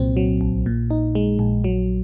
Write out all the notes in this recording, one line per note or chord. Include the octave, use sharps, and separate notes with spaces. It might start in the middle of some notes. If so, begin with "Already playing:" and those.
Already playing: C2 A#2 F#3 C4
F#3
A#1
A#2
D#4
G#3
A#1
F#3